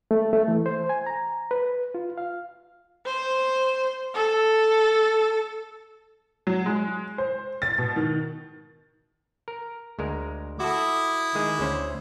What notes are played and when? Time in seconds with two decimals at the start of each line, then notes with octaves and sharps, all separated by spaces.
0.11 A3
0.33 A3
0.48 E3
0.66 C5
0.89 G#5
1.06 A#5
1.51 B4
1.95 F4
2.18 F5
3.06 C5
4.15 A4
6.47 F#3
6.66 G#3
7.18 C5
7.62 A6
7.78 B2
7.96 D#3
9.48 A#4
9.99 D2 G#3 A#4
10.60 E4 F#4 A4 D6 D#6
11.35 D#3 G#3 G#4
11.60 D2 C#4 C5